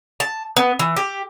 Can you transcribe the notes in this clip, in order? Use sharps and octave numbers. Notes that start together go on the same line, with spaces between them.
A5
B3
E3
G4